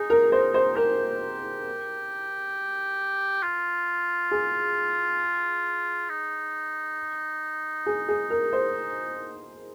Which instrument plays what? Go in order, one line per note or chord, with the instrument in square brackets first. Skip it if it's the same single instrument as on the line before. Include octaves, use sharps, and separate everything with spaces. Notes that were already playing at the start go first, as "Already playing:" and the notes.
Already playing: [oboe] D#4 [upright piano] G#4
[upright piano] A#4
[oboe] D#4 [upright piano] C5
[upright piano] C5
[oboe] G4 [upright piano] A#4
[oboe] F4
[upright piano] G#4
[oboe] D#4
[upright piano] G#4
G#4
A#4
C5